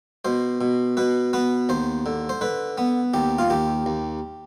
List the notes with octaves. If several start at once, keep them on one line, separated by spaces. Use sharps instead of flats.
B2 C5
B2
B2 B4
B3 B4
D#2 C5
D3
C5
D3 B4
B3
D#2 G4
F4
D#2 G4
D#2